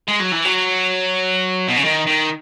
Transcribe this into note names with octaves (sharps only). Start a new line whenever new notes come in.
G#3
F#3
E3
F#3
B2
C#3
D#3
D#3